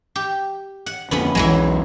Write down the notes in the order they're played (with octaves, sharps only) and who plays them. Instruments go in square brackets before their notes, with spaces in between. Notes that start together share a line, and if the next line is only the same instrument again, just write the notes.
[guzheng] G4
F#5
[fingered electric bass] F2 D3 [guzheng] B3 C#4 B5
[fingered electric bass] B1 E2 B2 [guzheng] E3 F#3 G#3